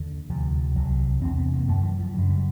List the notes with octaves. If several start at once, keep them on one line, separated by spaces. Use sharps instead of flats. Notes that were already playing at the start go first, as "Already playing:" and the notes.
Already playing: D#2 D3
D2 C3 F3
C2 C3 F#3
E2 C3 C4
B3
A#3
F#2 D3 A3
F3
E3
F3
F#2 C#3 F#3
G3